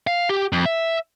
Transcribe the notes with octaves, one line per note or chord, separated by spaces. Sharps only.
F5
G4
F2
E5